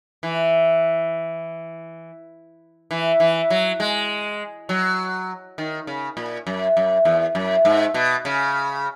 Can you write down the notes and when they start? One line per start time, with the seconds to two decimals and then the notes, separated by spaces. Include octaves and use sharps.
0.23 E3
2.91 E3
3.20 E3
3.50 F#3
3.80 G#3
4.69 F#3
5.58 D#3
5.87 C#3
6.17 A#2
6.47 F#2
6.77 F#2
7.05 E2
7.35 F#2
7.65 G#2
7.94 B2
8.25 C#3